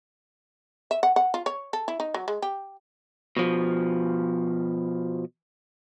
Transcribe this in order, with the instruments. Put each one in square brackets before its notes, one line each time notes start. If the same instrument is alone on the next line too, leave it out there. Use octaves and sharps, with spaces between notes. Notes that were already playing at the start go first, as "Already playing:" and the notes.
[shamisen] E5
F#5
F#5
F4
C#5
A4
E4
D#4
F#3
G#3
G4
[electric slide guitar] B2 F3